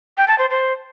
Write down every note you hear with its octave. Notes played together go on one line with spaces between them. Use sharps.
G5
A5
C5
C5